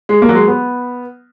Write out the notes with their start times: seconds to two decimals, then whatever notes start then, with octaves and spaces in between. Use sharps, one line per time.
0.09 G#3
0.22 A#3
0.29 F#3
0.35 G#3
0.48 B3